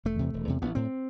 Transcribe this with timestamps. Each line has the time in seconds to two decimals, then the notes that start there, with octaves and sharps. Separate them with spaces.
0.05 E1 A3
0.19 E2 C3
0.33 E1
0.48 E2 C3
0.62 A1 B3
0.75 A2 C4